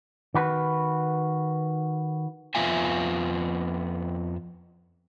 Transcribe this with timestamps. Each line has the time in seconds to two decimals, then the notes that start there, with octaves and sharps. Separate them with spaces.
0.34 D#3 F#4 B4
2.55 F2 B3 F4 E5 F5 G#5